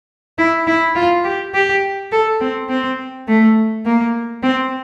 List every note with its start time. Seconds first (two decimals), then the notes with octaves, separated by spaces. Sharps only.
0.38 E4
0.67 E4
0.95 F4
1.24 G4
1.54 G4
2.12 A4
2.41 C4
2.69 C4
3.28 A3
3.86 A#3
4.43 C4